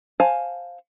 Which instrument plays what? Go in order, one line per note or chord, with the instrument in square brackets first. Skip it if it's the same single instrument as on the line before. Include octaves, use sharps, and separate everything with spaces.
[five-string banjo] C5 F5 G#5 A5